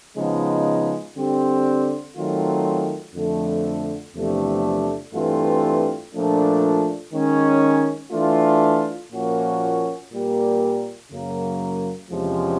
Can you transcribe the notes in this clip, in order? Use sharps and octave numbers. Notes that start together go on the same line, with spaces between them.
C#3 F3 G#3 B3 D#4
D3 G3 C4
D#3 F#3 A3 C4 F4
F2 D3 F3 A3
E2 C3 F3 A3 D4
G2 E3 A3 C4 F4
A#2 F3 A3 D4
D#3 G#3 C#4
E3 A3 D4 F4
A#2 F3 A#3 C#4 F#4
A#2 G3 A#3
F#2 C#3 F#3 A#3
E2 C3 F3 G#3 C#4